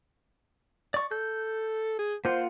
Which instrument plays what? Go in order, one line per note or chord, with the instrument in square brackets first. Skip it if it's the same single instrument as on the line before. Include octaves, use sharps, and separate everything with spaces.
[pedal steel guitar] D5 C#6
[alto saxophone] A4 [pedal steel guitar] G6
[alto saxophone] G#4
[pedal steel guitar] A#3 F4 F#5 [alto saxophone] C5